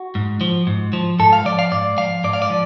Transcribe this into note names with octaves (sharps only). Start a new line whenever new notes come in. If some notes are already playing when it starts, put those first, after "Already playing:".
Already playing: F#4
G#2
F3
G#2
F3
G#2 A4
F5
F3 D5
F5
G#2 D5
F3 F5
G#2 D5
F5
D5
F3